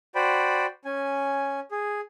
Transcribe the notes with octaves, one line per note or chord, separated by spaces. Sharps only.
F#4 C5 D5 G5 B5
C#4 G#5
G#4